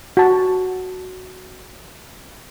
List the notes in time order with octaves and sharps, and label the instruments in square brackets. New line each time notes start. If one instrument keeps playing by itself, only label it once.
[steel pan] F#4 A5